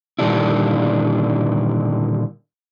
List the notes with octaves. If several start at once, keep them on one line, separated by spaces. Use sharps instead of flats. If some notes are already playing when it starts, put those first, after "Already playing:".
A#2 D3 D#3 G3 D4 E4